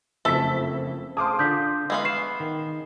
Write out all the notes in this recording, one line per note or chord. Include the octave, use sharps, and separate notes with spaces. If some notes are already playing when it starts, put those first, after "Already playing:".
F#1 F2 A3 A4 E5 B6
G#4 C5 F5 A5 C6 D6 D#6
D3 D4 F4 G6 B6
G#3 B3 E5 F5 G#5
C#6 C7 E7
D#3